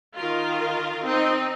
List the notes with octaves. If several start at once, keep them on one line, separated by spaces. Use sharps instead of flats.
D#3 F4 A#4
C4 D#4